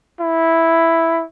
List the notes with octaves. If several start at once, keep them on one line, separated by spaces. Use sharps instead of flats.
E4